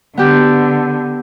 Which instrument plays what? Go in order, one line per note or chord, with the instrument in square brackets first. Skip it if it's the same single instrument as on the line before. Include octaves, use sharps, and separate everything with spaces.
[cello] D3 [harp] B3 G4